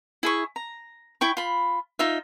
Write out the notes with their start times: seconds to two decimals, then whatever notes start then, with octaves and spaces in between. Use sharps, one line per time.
0.23 E4 G#4 C#6
0.56 A#5
1.21 E4 G5 C#6
1.37 F4 B5
1.99 D#4 F4 E5